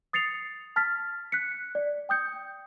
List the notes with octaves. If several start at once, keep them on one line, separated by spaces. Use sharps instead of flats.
D#6 A6 C7 C#7 F7
A5 F6 A6 B6
F#6 B6 C#7
D5
G5 D#6 G6 C#7